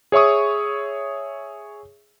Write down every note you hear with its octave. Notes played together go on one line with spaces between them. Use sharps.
G#4 C#5 E5 C#6 D#6